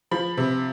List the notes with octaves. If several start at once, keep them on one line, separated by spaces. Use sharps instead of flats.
F3 B5
C3